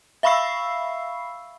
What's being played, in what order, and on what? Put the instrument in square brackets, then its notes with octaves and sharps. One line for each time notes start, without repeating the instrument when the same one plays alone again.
[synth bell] E5 F5 B5 C#6 E6 C7